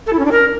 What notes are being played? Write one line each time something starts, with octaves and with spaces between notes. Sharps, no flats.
A4
E4
C#4
D4
A#4